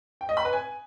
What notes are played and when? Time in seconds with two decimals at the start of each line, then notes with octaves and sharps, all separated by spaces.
0.21 G5
0.29 D#5
0.37 B5
0.45 B4
0.53 G#5